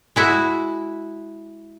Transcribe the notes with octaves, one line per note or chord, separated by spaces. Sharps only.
G#3 E4 F#4